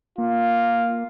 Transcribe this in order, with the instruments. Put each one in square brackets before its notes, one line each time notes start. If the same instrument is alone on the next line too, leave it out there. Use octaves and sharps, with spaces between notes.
[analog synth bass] A#3 [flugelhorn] F4